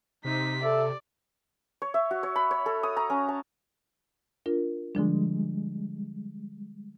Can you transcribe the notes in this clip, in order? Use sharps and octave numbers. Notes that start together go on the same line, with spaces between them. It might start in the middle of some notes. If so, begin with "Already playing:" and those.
C3 D#4 B6
A4 D5 E5
C#5
E5
F#4
C#5
B5
C#5
A4
D#6
A#5
C#4
A5
D4 F4 A#4
D3 F3 G3 G#3 D4